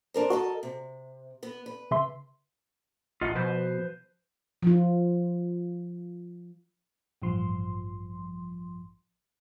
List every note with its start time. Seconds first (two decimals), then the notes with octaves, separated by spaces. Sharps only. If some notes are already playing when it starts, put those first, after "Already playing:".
0.14 D4 A#4 C5
0.30 F#4 A4 A#4 D#5
0.63 C3
1.43 B3 B4
1.66 B4
1.91 C#3 E5 C6
3.21 A1 F4 D#5 F#5
3.35 B2 F3 B4 C5
4.63 F3 F4
7.22 A1 G2 F3 C6